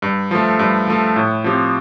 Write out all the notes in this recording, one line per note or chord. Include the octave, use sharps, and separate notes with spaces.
G2
F3 A3
G2
F3 A3
A2
F3 C4 G4